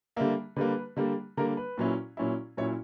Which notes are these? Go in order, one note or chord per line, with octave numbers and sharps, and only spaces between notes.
D3 G3 A#3 E5
D3 G3 A#3 B4
D3 G3 A#3
D3 G3 A#3 A#4
B4
A#2 F#3 C#4 E4
A#2 F#3 C#4 E4
A#2 F#3 C#4 E4 C#5